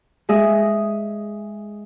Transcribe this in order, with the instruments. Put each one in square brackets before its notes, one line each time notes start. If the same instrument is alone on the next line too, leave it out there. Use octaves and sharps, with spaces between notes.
[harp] G#3 G#4 D#5 E5